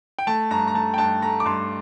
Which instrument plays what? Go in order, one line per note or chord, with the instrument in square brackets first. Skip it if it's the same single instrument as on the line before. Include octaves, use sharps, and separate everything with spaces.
[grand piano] G5
A3 A5
G2 A#5
A#5
A3 A5
G5
G2 A5
A3 A#5
D6
G2 C6